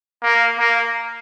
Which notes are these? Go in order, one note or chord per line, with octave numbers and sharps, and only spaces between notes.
A#3
A#3